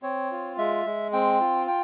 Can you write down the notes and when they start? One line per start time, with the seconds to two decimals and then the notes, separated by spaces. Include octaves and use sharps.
0.02 C4 C#5
0.31 F4
0.58 G#3 E5
0.86 G#3
1.13 C4 G5
1.40 F4
1.68 G5